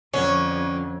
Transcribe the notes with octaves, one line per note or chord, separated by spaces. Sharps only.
F2 D3 C#4 C#5